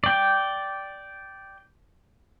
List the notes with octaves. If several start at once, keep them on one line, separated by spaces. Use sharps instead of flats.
D5 G5